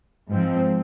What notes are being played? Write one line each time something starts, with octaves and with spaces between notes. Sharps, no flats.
G#2 F3 C4